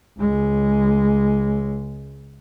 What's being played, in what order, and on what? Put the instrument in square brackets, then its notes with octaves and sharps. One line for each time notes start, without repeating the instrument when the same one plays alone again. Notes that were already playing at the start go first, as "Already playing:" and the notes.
[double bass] C#2 G#3